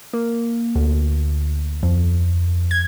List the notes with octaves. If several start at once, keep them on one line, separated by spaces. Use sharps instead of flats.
A#3
D2
F2
G#6